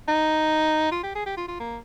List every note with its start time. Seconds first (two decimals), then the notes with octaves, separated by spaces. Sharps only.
0.08 D#4
0.92 F4
1.03 G4
1.15 G#4
1.26 G4
1.37 F4
1.48 F4
1.60 A#3